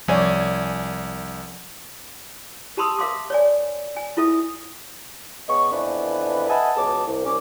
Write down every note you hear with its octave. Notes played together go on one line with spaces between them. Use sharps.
C2 F3 C#5 D5 G#5
G4 A5 B5 C6 D#6 E6
A#4 E5 F5 C6 D6
C#5 D5 G#5
G#5
E4 F4 A4 E5 D#6
C#3 B3 C#4 D#5 C#6
F2 E3 B3 D4 B4
D#5 E5 F#5 G#5 A5 B5
C#2 B2 F#3 G#4 A5 D6
C2
C2 C#4 D6